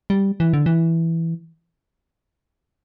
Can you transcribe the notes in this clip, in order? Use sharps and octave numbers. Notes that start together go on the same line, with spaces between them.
G3
E3
D3
E3